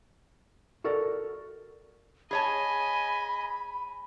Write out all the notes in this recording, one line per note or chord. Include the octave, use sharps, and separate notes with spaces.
F#4 A4 A#4 D5
G#4 C#5 D#5 G#5 A5 B5